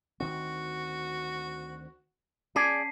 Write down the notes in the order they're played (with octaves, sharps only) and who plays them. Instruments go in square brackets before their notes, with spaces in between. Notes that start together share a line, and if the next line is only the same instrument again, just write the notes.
[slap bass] D2 D#3 C4 [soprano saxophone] F#4
[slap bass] C#4 [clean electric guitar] G#4 D5 [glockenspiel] A5 B6 C7